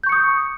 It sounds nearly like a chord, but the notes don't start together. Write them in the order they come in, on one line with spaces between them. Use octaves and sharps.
G6 C#6 C#7 D#6